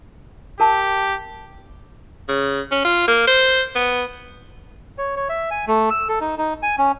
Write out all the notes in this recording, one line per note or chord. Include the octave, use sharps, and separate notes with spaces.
G4 A#4 A5
C#3
C#4
F4
A#3
C5
B3
C#5
C#5
E5
G#5
A3
E6
A4
D#4
D#4
G#5
C#4